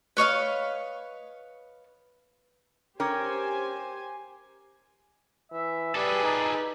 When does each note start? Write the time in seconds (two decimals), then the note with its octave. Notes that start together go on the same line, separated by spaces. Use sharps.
0.17 B4 C#5 D#5 F5
3.00 C#4 G4 A#4 C5 G5 G#5 D6 G#6
5.52 E3 E5
5.95 G3 G#4 A4 B4 D5
6.23 D#4